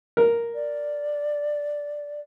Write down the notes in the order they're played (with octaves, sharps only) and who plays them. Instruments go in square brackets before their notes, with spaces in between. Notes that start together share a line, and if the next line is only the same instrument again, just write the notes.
[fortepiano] A#4
[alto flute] D5